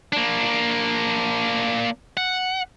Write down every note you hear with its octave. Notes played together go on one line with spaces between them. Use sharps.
A#3 D4
F#5